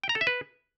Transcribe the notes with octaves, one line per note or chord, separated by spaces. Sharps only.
G5
A#5
A4
E5
B4